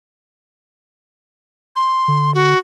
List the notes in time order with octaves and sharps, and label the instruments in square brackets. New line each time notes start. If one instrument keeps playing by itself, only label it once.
[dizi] C6
[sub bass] D3
[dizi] F#4